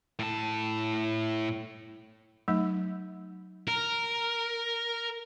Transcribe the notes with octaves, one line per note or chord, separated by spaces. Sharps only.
A2 A5
F#3 A3 D#4
A#4